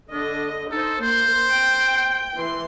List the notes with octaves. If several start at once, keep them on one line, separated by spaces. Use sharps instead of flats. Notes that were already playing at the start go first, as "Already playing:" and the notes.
D3 D4 D#5
D#4 A4 C5
A#3 C5 C6
G5
E3 C6